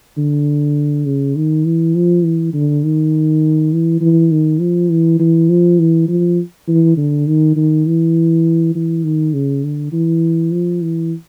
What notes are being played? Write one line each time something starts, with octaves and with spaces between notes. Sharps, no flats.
D3
C#3
D#3
E3
F3
E3
D3
D#3
E3
E3
D#3
F3
E3
E3
F3
E3
F3
E3
D3
D#3
D#3
E3
E3
D#3
C#3
D3
E3
F3
E3